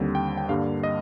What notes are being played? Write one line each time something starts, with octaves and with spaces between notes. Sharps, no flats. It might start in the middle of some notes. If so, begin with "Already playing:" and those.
Already playing: D#2 D3 G3 C4
G5
G5
G2 D3 G3 A#3 F5
D#5